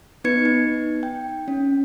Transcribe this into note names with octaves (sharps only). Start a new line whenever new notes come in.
B3 D#4 B4 G#6 C#7
D#4
G5
C#4